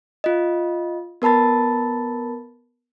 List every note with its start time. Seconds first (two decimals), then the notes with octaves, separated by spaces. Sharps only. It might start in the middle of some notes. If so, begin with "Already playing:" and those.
0.24 F4 D#5
1.22 B3 A#4 A5 B5 A6